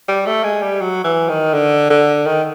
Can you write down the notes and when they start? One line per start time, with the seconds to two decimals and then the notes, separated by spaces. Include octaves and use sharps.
0.08 G3
0.26 A3
0.44 G#3
0.62 G3
0.81 F#3
1.04 E3
1.29 D#3
1.54 D3
1.90 D3
2.26 D#3